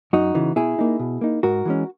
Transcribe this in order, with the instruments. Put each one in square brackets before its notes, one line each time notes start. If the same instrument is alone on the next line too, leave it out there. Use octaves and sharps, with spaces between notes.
[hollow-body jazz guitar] F#2 D#4 F#4
C#3 E3
B2 E4 G#4
A#3 D#4
B2
A#3 D#4
G#2 F#4 A#4
E3 G#3 C#4